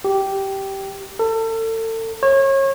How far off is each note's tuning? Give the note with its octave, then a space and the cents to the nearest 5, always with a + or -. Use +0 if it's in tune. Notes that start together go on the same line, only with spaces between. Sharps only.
G4 -10
A4 +35
C#5 -30